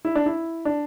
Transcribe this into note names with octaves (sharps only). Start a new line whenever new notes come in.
E4
D4
E4
D4